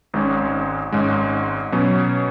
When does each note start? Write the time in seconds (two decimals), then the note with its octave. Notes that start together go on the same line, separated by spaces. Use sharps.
0.14 G#1 G#2 G#3 C#4
0.92 G#1 G#2 G#3 C#4
1.72 B2 F#3 C#4